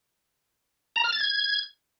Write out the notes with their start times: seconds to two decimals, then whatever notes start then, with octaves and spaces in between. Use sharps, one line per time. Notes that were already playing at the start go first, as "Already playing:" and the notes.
0.96 A#5
1.04 F6
1.12 A6
1.21 G#6